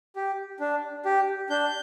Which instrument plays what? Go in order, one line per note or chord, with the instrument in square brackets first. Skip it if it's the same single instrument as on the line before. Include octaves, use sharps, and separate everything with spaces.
[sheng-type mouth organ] G4
D4
G4
D4 G6